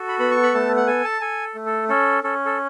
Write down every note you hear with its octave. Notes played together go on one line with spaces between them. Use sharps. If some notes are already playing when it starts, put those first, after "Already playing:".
Already playing: F#4 A4
B5
B3 B5
C#6
B5
A3 A5
F#5
A4 G#5
A5
A4 G#5
A3
A4
C#4 A4
C#4 A4
A4